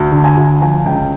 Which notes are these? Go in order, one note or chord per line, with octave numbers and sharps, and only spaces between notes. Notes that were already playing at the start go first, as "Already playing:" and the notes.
Already playing: D2
D3
G#5
D2
F3 G#5
C#2 G5